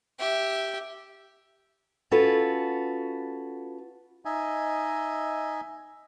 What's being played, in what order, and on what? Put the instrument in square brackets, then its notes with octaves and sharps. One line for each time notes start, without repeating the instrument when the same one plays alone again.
[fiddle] G4 E5
[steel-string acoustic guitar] C#4 F4 F#4 A4 B4
[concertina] D#4 D#5 E5 G#5